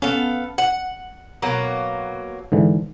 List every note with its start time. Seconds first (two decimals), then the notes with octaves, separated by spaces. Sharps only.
0.02 B3 C#4 A4 F5
0.58 F#5
1.42 B2 F#3 A#3
2.52 G#2 D3 E3